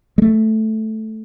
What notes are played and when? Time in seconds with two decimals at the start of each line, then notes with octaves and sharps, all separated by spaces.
0.18 G#3
0.22 A3